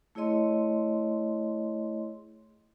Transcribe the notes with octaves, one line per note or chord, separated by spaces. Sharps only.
A3 E4 G#4 C#5 D#5 C6